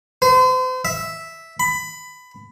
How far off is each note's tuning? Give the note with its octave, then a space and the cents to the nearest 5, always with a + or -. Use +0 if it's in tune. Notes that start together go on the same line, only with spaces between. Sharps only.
C5 -40
E5 -5
B5 +20